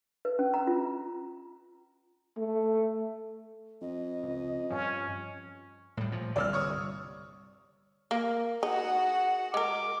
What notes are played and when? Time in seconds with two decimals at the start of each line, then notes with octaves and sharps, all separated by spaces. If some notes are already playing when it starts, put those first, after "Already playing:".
0.25 B4
0.39 C#4
0.54 A#5
0.67 F4
2.37 A3
3.82 F2 D#5
4.23 C#2
4.70 G2 F3 C#4
5.97 A2 G3
6.12 A#2 F3
6.36 G1 C2 D5 E6 F6
6.53 C#5 C#6 D#6
8.11 A#3 A#4
8.63 D#4 F#4 G#4 F#5
9.54 G#3 A#4 D6